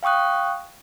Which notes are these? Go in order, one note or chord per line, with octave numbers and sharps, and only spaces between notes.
F5 G5 C#6 D#6 F#6